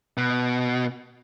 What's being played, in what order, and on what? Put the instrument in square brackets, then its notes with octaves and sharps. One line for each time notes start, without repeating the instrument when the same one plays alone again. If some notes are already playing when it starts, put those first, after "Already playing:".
[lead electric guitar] B2